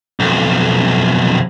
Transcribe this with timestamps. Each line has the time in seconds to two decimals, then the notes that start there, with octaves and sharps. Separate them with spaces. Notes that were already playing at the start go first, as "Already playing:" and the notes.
0.20 B1 F2